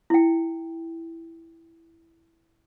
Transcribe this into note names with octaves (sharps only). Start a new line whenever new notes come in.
E4 G5